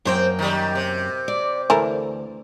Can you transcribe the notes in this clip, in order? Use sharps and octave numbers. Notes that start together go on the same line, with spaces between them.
F#2 A#3 C4 C5 G5
D#3 G3
C3
D5
D2 E3 A4 A#4